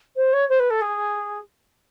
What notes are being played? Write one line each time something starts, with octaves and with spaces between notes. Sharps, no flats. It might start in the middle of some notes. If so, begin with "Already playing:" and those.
C5
C#5
C5
B4
A4
G#4